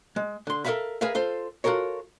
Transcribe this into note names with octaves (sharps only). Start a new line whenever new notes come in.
G#3
D3 C6
A4 A#4 C#5 E5 F5 B5
G#4 A#4 B4 E5 F5
F4 A4 C5
F4 F#4 A4 A#4 C#5